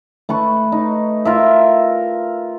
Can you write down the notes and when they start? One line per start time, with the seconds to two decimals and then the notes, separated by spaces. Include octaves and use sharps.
0.29 A3 B4 C#6
0.72 D#4
1.25 F4 A#4 E5